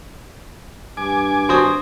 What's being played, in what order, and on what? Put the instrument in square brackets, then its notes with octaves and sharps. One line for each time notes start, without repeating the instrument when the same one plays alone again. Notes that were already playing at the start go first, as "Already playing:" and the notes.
[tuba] G2 [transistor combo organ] G#5 D6
[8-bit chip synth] G#1 F#4 D#6 [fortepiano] C5